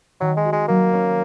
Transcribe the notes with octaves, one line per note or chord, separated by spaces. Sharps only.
D#3 F#3
G#3
F#4
G#3
F#3 A#3
C#4